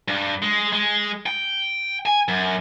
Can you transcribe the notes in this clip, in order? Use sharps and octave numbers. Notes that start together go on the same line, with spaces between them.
G2
G#3
G#3
G5
G#5
F#2